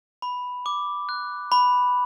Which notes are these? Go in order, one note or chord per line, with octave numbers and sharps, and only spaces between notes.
B5
D6
F#6
B5